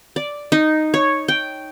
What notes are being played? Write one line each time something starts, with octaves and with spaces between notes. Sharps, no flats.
D5
D#4
C#5
G5